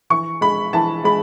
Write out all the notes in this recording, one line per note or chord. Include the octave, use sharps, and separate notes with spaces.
E3 C#6
G#3 B5
E3 A5
G#3 B5